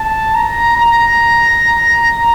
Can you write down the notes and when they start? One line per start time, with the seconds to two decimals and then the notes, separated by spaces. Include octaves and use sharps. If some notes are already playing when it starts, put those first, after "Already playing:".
Already playing: A5
0.35 A#5
0.76 A#5